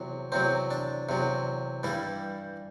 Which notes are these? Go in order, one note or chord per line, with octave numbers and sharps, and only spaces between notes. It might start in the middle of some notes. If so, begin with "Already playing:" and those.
Already playing: E2 C3 F#3
E2 C3 F#3 C4
D4
E2 C3 F#3
G2 E3 G3 E4